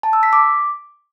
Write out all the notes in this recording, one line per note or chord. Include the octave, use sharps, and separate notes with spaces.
A5
E6
B6
D6